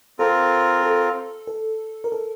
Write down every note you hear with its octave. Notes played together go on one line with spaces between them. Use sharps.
C4 F4 A4 A#4
A4
A4
A#4
A4